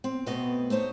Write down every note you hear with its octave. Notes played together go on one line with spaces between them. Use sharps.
C4
B2 A3 B3 C4 B4 D#5
A3 D#4 C5 C#5